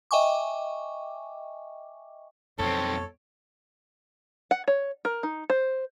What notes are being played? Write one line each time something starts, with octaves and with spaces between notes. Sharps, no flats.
D#5 E5 G5 G#5 C#6 D6
B1 F2 C4 A4 C#5
F#5
C#5
A#4
D#4
C5